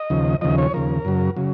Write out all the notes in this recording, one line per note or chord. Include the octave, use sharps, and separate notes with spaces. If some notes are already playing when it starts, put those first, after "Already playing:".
Already playing: D#5
D#2 C#3 F3
D#2 C#3 F3 D#5
C#5
D#2 C#3 F3 A#4
F#2 C#3 F#3
C#3 F#3